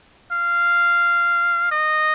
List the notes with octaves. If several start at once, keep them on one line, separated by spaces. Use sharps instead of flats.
F5
D#5